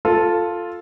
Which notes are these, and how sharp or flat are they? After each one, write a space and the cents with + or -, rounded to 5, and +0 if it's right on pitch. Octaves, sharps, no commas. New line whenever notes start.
F4 +0 A4 +0